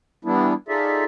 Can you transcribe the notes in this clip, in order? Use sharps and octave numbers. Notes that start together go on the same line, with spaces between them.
E3 G3 B3 D4 E4
D#4 F4 G#4 A4 D5 E5